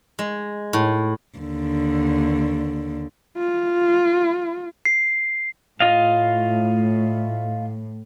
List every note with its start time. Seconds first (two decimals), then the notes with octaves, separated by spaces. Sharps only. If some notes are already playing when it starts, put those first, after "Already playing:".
0.19 G#3
0.73 A2
1.38 D#2 D3
3.38 F4
4.85 C7
5.80 A2 F4 D#5 F5